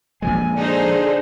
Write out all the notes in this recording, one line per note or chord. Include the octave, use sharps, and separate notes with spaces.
A#2 F3 G#3 G#5
D3 D#4 G#4 C5